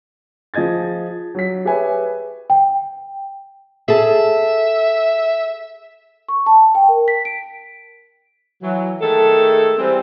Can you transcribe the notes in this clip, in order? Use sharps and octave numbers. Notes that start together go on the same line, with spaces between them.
F3 G#4 D#5 G#6 A6
F#3 B6
G4 G#4 B4 C#5 E5 G#5
G5
G#4 A4 E5 A5
C#6
A5
G5
A#4
B6
D7
E3 F#3
D#3 G#3 A3 A4
E3 G3 C4